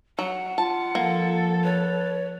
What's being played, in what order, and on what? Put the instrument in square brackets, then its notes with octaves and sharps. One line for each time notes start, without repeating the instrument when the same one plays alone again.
[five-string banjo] F#3 [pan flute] F#5
[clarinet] F4 [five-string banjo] A5
[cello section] F3 A4 [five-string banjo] A#3
[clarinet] B4 [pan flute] C#5